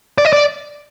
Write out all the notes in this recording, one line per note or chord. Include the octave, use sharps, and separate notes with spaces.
D5
D#5
D5